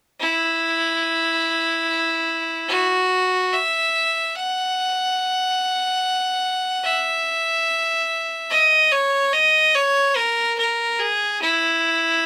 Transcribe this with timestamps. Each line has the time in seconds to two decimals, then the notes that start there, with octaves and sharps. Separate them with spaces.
0.20 E4
2.69 F#4
3.53 E5
4.35 F#5
6.84 E5
8.51 D#5
8.92 C#5
9.33 D#5
9.75 C#5
10.17 A#4
10.58 A#4
11.00 G#4
11.42 E4